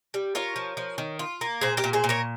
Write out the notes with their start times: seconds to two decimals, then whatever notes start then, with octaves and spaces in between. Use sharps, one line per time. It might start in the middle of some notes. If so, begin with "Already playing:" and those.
0.14 G3
0.35 F4 A#4 C#5
0.56 F3
0.77 F3
0.98 D#3
1.19 F4
1.41 A#3
1.61 A#2 G#4 C5
1.77 G4 A#4
1.84 A#2
1.93 G#4 C5
2.04 A#2
2.09 A#4 C#5